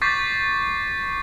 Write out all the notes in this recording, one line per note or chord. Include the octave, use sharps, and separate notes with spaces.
C#6 D6 G6 A6 B6 C7